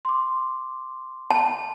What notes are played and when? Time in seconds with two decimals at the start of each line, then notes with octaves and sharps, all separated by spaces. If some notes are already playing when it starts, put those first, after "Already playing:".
0.05 C6 D6
1.31 A5